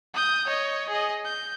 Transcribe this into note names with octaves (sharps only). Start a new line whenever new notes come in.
D#6 G6
C#5 D#5
G#4 D#5
G6